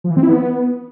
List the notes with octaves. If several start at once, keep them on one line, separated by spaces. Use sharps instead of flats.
F3
E3
C4
E4
B3